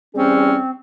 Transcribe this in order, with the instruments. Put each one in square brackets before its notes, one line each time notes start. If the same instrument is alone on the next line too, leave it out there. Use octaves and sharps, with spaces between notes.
[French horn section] E2 G3 G#4 [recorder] C4 [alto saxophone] C#4